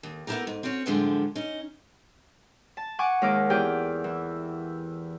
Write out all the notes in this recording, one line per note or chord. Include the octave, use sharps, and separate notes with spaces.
D#2
A3 B3 C#4 E4 G4 A#4
G#2
C4 C#4 F#4 C#5
F#2 A2 D3 F3 G3 G#3
C#4 D#4
A5
F#5 G#5 C#6 D6
D#2 G#3 A#4 D6
E2 G4 G#4 G5
E3